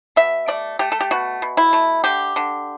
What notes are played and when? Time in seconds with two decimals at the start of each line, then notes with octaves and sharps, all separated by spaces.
0.16 B2 E5
0.48 A3 D5
0.79 A3 G4
0.92 A4
1.01 G4
1.11 B2 F#4
1.42 B2
1.57 E4
1.73 A3
2.04 D3 G4
2.36 D3